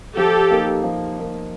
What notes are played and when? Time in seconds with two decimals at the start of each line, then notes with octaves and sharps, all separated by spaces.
0.17 F3 G4 A4
0.51 A#3 D#4
0.83 F3
1.17 A#3 D#4